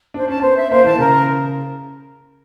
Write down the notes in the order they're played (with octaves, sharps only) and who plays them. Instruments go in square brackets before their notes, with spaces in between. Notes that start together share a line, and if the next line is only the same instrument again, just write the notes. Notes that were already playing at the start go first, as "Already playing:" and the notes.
[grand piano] D4 [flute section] C5
[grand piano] C#4 [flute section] A5
[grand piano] B3 [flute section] C5
[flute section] E5
[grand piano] A#3 [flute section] C5
[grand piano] E3 [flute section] A5
[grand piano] C#3 [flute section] A#4